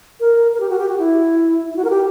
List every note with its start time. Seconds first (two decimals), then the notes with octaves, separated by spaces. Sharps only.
0.20 A#4
0.54 A#4
0.60 G4
0.70 F#4
0.79 G4
0.89 F#4
0.99 E4
1.69 E4
1.76 F#4
1.84 A#4
1.90 G4